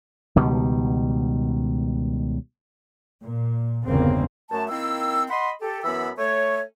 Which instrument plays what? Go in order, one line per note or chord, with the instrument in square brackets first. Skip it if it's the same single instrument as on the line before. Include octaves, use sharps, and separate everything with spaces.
[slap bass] C#2 B2 D#3 G3
[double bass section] A#2
G1 E2 C#3 A#3 C4
[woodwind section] F#2 A3 A5
D#3 A#3 C4 E4 E6
D#5 F#5 B5 C6
G4 A4
F#2 E3 B3 B5 E6
A3 C#5